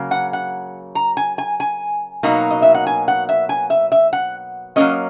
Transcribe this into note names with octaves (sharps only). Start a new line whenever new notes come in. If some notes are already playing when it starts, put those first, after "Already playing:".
Already playing: C#3 F#3 A#3
F#5
F#5
A#5
G#5
G#5
G#5
B2 F#3 A#3 D#4
D#5
E5
F#5
G#5
F#5
E5
G#5
E5
E5
F#5
F#3 A#3 C#4 D#5